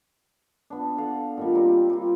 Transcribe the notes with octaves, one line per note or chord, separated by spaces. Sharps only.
B3 D4
A4 F5 F#5
A#2 D#3 G3
G3 C4 A#4
G3 F4